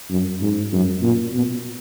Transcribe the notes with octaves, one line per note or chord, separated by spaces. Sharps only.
F#2
G#2
F#2
A#2
B2